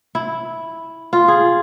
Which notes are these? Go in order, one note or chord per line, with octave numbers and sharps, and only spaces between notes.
E4
F4
G#4